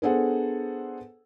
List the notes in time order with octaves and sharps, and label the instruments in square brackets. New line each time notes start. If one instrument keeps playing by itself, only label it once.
[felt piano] B3 D4 G#4 A4 C5 F#5